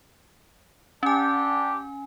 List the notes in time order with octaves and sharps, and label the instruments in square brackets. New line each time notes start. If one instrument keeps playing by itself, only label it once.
[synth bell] C#4 G#5 [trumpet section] D4 G4